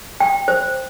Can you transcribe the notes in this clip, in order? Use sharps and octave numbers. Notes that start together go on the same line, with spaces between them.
G5
C5